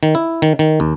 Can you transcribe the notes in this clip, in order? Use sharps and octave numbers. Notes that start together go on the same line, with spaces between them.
D#3
E4
D#3
D#3
D#2